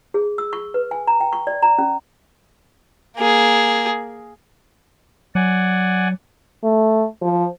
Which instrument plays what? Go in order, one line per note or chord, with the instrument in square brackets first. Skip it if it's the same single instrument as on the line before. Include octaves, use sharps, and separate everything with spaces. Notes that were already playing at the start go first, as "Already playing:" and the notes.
[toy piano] G#4
E6
C#6
B4
G#5
A#5
G5
C#6
D5
A#5
C#4
[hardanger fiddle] A#3 G#4
[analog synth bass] F#3 [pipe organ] D5 F#5 G#5
[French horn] A3
F3